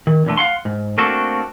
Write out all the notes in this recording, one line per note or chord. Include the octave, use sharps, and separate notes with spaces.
D#3
B1 E2 D3 A3
F5 F#5 C6
G#2
A3 A#3 C4 D4 F#4 A4